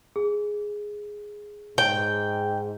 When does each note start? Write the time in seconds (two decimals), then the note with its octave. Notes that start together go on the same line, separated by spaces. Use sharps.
0.16 G#4
1.78 G#2 G5